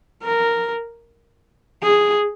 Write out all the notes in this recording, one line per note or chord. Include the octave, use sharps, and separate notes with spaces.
A#4
G#4